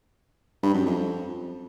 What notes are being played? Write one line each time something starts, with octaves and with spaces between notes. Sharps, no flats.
G2
F#2
F2